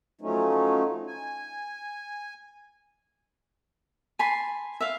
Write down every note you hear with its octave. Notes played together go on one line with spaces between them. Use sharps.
F3 F#3 A3 C#4 D#4
G#5
G#5 A5 B5 C6
E5 F5